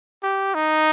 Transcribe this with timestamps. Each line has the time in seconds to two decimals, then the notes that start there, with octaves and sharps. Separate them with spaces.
0.23 G4
0.54 D#4